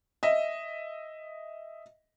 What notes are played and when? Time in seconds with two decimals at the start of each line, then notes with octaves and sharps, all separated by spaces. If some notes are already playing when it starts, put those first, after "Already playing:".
0.23 D#5 E5